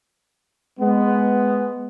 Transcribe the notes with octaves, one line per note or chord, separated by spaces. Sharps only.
G#3 B3